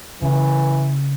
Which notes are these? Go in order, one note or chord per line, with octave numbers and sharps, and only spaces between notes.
C#3 E3